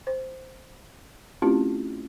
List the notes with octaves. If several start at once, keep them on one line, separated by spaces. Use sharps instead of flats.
C5
A3 C4 C#4 E4 F4 G4